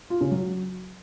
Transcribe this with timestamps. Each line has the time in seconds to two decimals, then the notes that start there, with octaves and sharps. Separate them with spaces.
0.10 F4
0.21 C#3
0.31 F#3